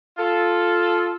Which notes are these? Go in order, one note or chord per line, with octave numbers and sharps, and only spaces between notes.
F4 A4